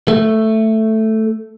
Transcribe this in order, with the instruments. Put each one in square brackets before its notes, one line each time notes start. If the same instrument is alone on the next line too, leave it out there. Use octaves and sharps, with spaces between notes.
[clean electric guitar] A3